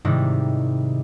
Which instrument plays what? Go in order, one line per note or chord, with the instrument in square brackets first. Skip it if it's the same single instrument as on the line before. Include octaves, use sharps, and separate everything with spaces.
[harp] G#2 C3 D#3 G3 D#4 E4